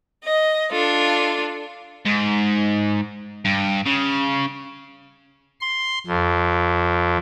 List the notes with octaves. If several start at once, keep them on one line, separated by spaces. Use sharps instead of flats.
D#5
D4 F4 A4
G#2
G2
C#3
C6
F2